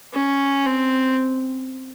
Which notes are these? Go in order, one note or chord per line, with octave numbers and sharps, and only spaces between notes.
C#4
C4